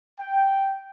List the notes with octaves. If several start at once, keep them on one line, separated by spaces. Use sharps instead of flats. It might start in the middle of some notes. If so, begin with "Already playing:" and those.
G5